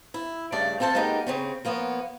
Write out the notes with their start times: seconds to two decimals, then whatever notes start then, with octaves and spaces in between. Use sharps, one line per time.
0.14 E4
0.52 G2 C#3 A3 D4 D5
0.80 C4 F4 A4 C5 A5
0.95 G#3 A#3 B3 D#4 G4
1.27 C#3 C4 C#4
1.65 F3 A#3 B3 C#5